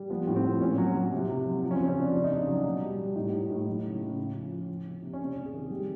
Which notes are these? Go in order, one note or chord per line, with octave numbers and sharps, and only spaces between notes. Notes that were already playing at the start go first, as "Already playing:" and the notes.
Already playing: G3
F3 B3
A2
C4
F3
A#2 C#4
F#3
F#3
C3
C3
F#3
F3
C#4
C4
C#3
C#4
F3 D4
C#3 D4
D#4
C#3 D4
F#3
B2
G3
G3
A2 D#4
A2
A2
F#3 D#4
C#3
C#3
C#3
F3
F3
F3
C3
C3
C#4
C3 D4
C3
G#4
D#3
G3 G4